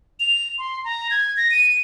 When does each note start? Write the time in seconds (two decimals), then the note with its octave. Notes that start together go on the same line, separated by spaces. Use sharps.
0.20 F7
0.58 C6
0.84 A#5
1.11 G#6
1.37 A#6
1.51 D#7